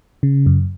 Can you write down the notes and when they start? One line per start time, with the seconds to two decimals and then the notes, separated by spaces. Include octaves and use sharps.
0.23 C#3
0.46 F#2